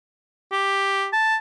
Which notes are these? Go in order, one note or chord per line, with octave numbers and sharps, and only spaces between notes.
G4
A5